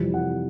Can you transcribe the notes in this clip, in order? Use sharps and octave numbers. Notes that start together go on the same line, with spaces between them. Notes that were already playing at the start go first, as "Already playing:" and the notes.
Already playing: F2 C3 E3 G3
F#5